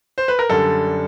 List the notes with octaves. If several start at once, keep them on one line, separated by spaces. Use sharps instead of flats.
C5
B4
A#4
F#2 D3 G3 A4